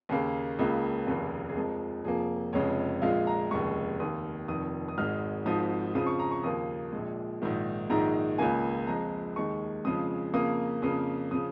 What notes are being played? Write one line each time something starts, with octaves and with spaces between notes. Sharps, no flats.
D#2 C#3 A#3
C#2 C#3 A#3
F1 D#2 C#3 A#3
G#4
F2 F3 G#3 A#4
F1 F2 F3 A#3 G#4
F1 F2 C#3 G#3 C#5
A#1 A#2 G#3 F5
A#5
F1 D#2 C#3 G#3 C#6
D#2 D#3 A#3 D#6
F1 F2 D#3 D#6
D#6
G#1 G#2 G#3 F6
G#1 G#2 F3 D#6
F2 C#3 F3 D#6
C#6
A#5
C#6
D#2 C#3 F3 A#3 D#6
A#1 A#2 G#3
A#1 G#2 D#3
A#1 G#2 D#3 G#3 A#5
C#2 C#3 A#3 G#5
F2 F3 G#3 A#5
D#2 D#3 G#3 C#6
F2 C#3 F3 G#3 D#6
F2 C#3 A#3 D#6
F2 C#3 A#3 D#6
C#3 F3 D#6